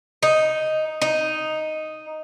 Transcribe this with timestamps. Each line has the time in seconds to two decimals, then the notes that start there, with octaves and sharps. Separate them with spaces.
0.23 D#4
1.02 D#4